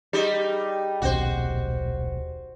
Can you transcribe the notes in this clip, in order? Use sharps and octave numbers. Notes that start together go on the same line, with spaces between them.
G3 D#4 G4 G#4 D#5
D#1 B1 C#4 F#4 C5